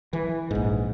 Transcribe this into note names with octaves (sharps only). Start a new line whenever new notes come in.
E3
A#1 G#2